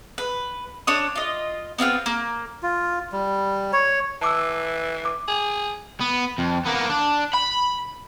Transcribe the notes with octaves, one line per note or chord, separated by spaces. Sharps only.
B4
D4 C#5 D#6
F4 D#5
B3 C4 F4 F6
A#3
F4
G3
C#5
E3 A5 D6 E6
D6
G#4
B3
F2
A#3 B3
D4
B5